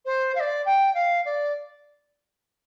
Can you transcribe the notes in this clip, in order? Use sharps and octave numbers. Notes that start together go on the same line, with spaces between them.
C5
F5
D5
G5
F5
D5